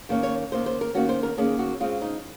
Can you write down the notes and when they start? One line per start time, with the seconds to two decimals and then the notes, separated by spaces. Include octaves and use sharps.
0.09 D#3 A#3 C#4
0.23 C#5
0.52 D#3 A#3 C#4 C5
0.66 C5
0.81 A#4
0.95 D#3 A#3 C#4 F#4
1.09 C5
1.23 A#4
1.38 D#3 A#3 C#4 G#4
1.59 F#4
1.80 C#3 G#3 C4 F4
2.02 D#4